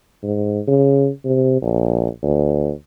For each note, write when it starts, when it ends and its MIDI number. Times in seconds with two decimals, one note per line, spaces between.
0.23 0.60 44
0.68 1.09 49
1.25 1.59 48
1.62 2.08 34
2.23 2.72 38